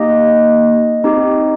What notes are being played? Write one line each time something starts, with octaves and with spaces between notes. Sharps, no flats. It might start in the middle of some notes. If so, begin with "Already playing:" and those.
Already playing: A#3 D#4 G4 D#5
C4 D#4 G4